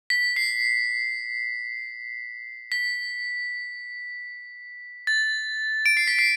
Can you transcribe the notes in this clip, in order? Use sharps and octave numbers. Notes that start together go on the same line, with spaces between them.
B6
C7
B6
A6
D7
C7
B6
C7